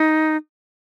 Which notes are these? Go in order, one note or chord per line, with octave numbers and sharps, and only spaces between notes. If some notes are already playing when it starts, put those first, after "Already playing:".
Already playing: D#4